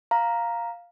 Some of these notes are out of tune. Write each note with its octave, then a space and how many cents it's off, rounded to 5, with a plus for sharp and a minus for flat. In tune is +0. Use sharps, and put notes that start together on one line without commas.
F5 +0 A#5 +0